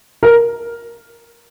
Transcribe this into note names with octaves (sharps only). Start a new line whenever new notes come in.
A#4